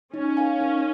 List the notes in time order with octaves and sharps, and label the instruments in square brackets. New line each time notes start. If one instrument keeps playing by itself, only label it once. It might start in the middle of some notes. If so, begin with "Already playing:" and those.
[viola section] C#4 [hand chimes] D#4
[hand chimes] A#4 F5 G#5
D#4